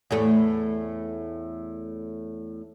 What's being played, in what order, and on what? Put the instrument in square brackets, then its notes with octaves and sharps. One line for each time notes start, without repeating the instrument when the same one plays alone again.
[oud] E2 A2 A3